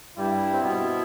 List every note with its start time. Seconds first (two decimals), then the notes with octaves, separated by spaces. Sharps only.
0.17 G2 G3 E4
0.52 C4
0.62 B2 B3